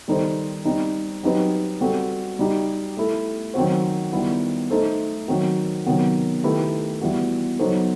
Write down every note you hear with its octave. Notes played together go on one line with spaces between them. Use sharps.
D#3 G3 D#4 A4 C5
G3 C4 D#4
F#3 C4 D#4 G4 B4
G3 C4 F#4 A4
G3 D#4 G4
A3 E4 A4
D#3 F#3 C4 F#4 C5
D#3 G3 B3 E4
A3 D#4 A4 C5
D#3 F#3 C4 F#4
C3 D#3 F#3 B3
D#3 A3 E4 G4 B4
E3 G3 B3 F#4
F#3 B3 D#4 A4 C5